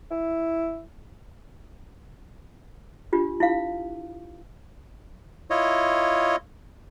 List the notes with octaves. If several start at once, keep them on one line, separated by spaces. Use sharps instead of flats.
E4
D4 F4 G4
E4 F4 F5
E4 F4 C#5 D#5